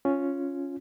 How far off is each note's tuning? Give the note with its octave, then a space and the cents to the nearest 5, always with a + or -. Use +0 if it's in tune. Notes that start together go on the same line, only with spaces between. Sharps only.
C#4 +0 F4 +0